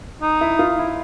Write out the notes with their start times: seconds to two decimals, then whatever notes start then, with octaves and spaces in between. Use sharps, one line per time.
0.22 D#4
0.41 E4
0.59 F4
0.79 E4